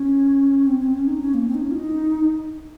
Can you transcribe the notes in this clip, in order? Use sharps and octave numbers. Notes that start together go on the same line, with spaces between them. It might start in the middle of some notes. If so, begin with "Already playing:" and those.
Already playing: C#4
C4
C4
C#4
D#4
C#4
A#3
C4
D#4
C#4
F4
D#4